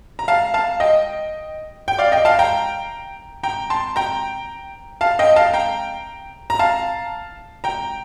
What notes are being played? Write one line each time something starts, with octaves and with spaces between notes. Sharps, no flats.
A#5
F5 A5
F5 A5
D#5 G5
G5
D5 F5
D#5 G5
F5 A5
G5 A#5
G5 A#5
A5 C6
G5 A#5
F5 A5
D#5 G5
F5 A5
G5 A#5
A#5
F5 A5
G5 A#5